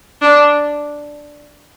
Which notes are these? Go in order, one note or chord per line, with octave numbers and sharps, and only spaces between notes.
D4